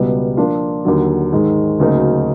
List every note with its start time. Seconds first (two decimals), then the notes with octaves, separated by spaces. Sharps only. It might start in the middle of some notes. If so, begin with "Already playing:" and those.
Already playing: C#2 B2 G3 B3
0.37 F3 A#3 D4 F4
0.85 D#2 D3 F#3
1.33 G#2 D#3 G#3
1.79 D2 C#3 F#3 A#3 D#4